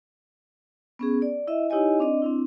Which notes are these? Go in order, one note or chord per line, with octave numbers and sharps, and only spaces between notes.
B3 C#4 G#4
D5
E4 D#5 E5
D#4 E4 G4 C#5 D#5 G#5
C4 D4 D5 D#5
C4 D4 E4